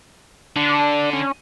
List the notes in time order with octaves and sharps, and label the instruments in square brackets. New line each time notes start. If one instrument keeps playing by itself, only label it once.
[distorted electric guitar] D3 [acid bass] D4
[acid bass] C#4